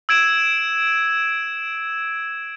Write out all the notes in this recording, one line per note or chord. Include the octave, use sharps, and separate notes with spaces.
E6 G#6 D7 E7